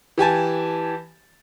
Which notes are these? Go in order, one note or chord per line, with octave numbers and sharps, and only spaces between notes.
E3 G4 G#5 A5